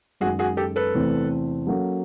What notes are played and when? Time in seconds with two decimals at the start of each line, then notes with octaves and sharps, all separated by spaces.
0.20 F#2 D#3 G#3 F#4 G#4
0.39 F#4 G#4
0.57 G4 A4
0.76 A4 B4
0.94 E2 C3 E3 A3 C4
1.67 F#3 A#3 C#4 F#4 A4